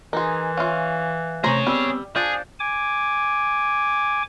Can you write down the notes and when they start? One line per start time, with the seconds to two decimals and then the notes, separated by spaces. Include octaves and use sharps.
0.13 E3 D#4 G#4 A#4 C6
0.57 C#4 F4 E5 F5
1.44 C3 A3 C#4 G#4 C5 C#5 A#5
1.67 G3 B3 C4 E6
2.16 F3 D4 G#4 G6 A6
2.60 G#5 D6